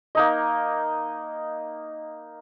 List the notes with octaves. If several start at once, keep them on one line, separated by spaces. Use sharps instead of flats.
A#3 D#4 D#5